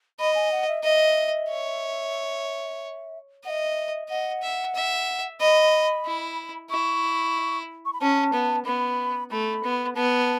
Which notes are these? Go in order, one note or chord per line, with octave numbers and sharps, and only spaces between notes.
D#5 B5
G#5
F#5
E5
D#5 E5
C#5
D#5 E5 F#5
D#5 F#5
E5
E5
D#5 B5
E4
E4 C#6
C#6
B5
C#4 A5
B3
B3 B5
A3 B5
B3
B3 A5